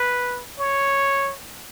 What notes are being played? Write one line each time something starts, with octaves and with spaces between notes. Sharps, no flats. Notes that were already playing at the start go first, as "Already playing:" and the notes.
Already playing: B4
C#5